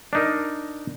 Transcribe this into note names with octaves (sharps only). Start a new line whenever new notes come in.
D4 D#4 A#4